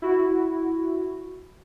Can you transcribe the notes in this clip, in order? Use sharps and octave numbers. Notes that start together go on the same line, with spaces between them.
E4 F#4